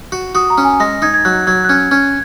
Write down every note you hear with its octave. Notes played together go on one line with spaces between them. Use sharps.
F#4
F#4 D#6
A#5
C#4
G#5
G#3 A#6
D#4 G#6
G#6
F#3 F#6
F#3 G#6
F#6
C#4 G#6
C#4 G#6